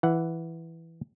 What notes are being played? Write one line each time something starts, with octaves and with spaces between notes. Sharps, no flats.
E3 F#5